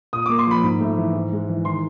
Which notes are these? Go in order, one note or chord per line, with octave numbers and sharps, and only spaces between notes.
A#2 D#6
A#3 D6
C6
F3 B5
G#2
A3
E3
G#2
G#3
E3
D#3 C6